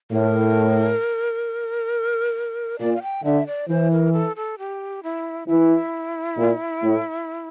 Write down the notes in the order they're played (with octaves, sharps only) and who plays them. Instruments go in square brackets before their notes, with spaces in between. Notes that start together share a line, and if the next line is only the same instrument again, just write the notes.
[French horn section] A2 [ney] A#4
[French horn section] A#2 [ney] D5
[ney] F5
G5
[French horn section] D3 [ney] E5
[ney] D5
[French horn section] E3 [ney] C5
[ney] A#4
A4
A4
G4
E4
[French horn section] E3 [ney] E4
[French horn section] A#2
A2